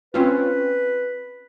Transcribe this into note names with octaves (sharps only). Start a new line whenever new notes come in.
C4 C#4 F4 B4